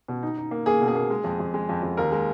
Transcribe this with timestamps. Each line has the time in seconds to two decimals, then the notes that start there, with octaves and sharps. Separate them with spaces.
0.08 B2
0.23 D#4
0.38 D#4
0.51 A#3
0.66 A#3 G#4
0.81 B2
0.88 G#4
0.95 A#3
1.10 G#3
1.24 F2
1.40 F2
1.54 G#3
1.69 F2
1.83 F2
1.97 D#2 A#4
2.12 G#3